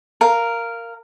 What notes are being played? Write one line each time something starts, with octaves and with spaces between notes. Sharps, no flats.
A#4 F5